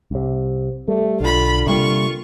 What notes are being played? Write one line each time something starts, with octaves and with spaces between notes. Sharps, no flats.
C2 C3
G3 A3
B1 D3 F4 B5
C3 G3 A#3 F4 C#6